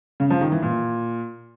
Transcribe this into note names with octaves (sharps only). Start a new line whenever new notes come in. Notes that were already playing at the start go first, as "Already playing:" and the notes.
C#3
F3
D#3
E3
A#2